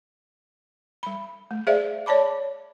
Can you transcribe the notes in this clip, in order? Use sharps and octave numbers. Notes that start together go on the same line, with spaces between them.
G3 B5
A3
G#4 C5 D5 E5 F5
C#5 D5 A5 B5 D6